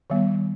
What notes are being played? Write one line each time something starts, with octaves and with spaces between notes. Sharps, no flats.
D#3 G3 B3